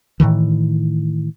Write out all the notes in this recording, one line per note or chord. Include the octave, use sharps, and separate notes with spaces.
A2 C3 D#3 E3